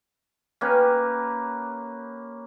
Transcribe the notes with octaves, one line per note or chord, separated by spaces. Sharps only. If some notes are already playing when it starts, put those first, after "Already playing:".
A#3 C#4 G4 B4